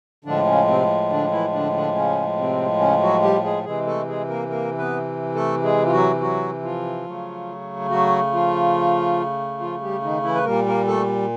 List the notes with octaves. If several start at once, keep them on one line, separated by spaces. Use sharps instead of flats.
A2 D3 F3 G#3 D4
C#3 C#4
C3 C4
D3 D4
E3 E4
D3 D4
D3 D4
C#3 C#4
C3 C4
C#3 C#4
F#3 F#4
G3 G4
G#3 G#4
C3 E3 G#3 G#4
A3 A4
G#3 G#4
A#3 A#4
A#3 A#4
B3 B4
A3 A4
G#3 G#4
F4
F#3 F#4
F#3 F#4
F3 F4
C#3 F#3 A3
F#3 F#4
F3 F4
F3 F4
G3 G4
D#3 D#4
E3 E4
B4
A#2 G3 A#3 A#4
A#3 A#4
A3 A4